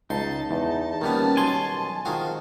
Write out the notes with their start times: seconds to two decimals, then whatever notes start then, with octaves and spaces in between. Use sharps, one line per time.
0.10 C#2 D#4 A5 C6
0.51 E2 A5
1.01 D#2 D#3 F3 G3 B3 C#4
1.37 B1 C#5 G#5 C6 D6
2.05 D#3 C4 D#4 F4 F#4 G#4